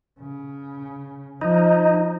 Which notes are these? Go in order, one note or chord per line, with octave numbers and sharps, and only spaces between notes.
C#3
F3 D#4